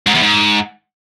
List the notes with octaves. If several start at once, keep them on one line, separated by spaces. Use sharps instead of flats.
G#2
E2
G#2